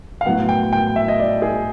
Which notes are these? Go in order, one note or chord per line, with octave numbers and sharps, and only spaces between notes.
F5
A2 F#3 B3 F#5
G5
G5
E5
D#5
D5
G#4